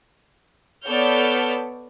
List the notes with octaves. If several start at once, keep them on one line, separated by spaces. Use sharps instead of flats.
B3 A4 C#5 D5 F6 G6